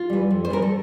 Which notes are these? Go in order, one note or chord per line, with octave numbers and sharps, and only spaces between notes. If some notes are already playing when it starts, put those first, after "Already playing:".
Already playing: F4
E3 G3
F2
C5
E3 G3 A#4
A4